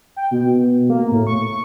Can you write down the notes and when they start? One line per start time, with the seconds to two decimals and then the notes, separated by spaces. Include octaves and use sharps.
0.16 G5
0.31 B2
0.57 B2
0.90 A#3
1.12 A2
1.27 C#6